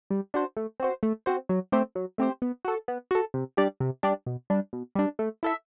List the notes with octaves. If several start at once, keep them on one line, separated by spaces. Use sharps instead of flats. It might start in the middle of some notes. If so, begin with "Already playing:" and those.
G3
D4 F#4 C5
A3
C4 F#4 C5
A3
C4 F#4 C5
F#3
A3 C4 G4 C5
F#3
A3 C4 G4 C5
B3
F#4 A4
B3
F#4 A4
C3
G3 D4 G4 D5
C3
G3 D4 G4 D5
B2
G3 D4
B2
G3 D4
A3
E4 A4 E5